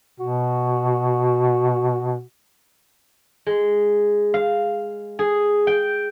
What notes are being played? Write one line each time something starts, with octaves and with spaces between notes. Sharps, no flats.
B2 F#4
G#3
F5
G#4
G5